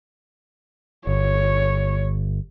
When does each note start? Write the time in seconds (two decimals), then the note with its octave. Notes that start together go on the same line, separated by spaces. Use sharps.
1.07 G1 C#5